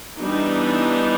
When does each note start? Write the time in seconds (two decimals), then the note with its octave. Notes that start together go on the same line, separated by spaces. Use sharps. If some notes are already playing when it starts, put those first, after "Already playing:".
0.18 E3 G3 B3 D4 D#4